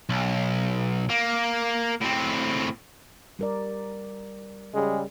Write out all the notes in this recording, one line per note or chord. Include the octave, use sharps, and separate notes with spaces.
B1
A#3
A2 C4
G3 A#4 D5
C#3 G3 G#3